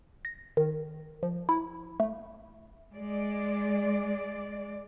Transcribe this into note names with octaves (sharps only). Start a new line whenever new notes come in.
A#6
D#3
F3
E4
A3
G#3 D5